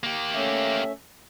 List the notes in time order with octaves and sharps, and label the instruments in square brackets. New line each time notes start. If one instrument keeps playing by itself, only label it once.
[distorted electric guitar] A#3 G4
[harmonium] A3 C#4 E5